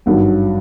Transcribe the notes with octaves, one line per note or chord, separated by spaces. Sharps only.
G#1 G2 D#3 F#3